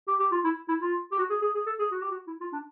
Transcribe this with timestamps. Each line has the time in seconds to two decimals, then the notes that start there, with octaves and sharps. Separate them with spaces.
0.08 G4
0.20 G4
0.32 F4
0.44 E4
0.68 E4
0.81 F4
1.12 G4
1.18 F#4
1.30 G#4
1.42 G#4
1.55 G#4
1.66 A4
1.79 G#4
1.91 F#4
2.01 G4
2.11 F#4
2.27 E4
2.40 F4
2.52 D4